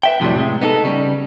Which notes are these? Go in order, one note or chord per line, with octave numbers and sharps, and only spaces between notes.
B4 E5 G5
F2 A2 C3 D#3 F#3 G3
A2 C3 G#3
B3 D#4 G4 A4
C#3 G3